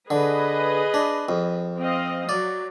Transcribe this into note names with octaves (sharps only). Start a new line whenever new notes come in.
D3 G#4 B4 D#5
D4
F2
C4 D#5 F5
F#3 D5